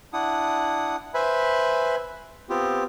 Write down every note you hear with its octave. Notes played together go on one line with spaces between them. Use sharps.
D4 E4 F#5 D#6
B4 C5 E5 G#5 B5
B3 C4 F4 G4